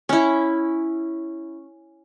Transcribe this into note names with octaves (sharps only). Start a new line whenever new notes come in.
C#4 E4